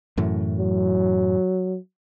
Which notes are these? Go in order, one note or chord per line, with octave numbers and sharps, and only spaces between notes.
F#2 A2 E3
F#3